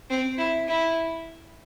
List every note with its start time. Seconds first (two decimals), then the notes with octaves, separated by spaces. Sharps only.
0.10 C4
0.38 E4
0.67 E4